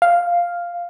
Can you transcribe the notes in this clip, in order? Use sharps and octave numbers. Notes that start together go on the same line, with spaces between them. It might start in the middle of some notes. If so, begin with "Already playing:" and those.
F5